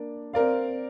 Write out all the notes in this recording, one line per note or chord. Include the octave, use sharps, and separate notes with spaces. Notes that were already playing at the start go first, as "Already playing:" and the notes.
Already playing: A#3 D4 D5
C4 A#4 D5 F5